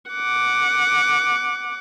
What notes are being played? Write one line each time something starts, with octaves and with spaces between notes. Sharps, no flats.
F#5 D6